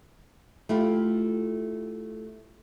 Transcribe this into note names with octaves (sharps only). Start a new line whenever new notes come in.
A3 E4 F4 G4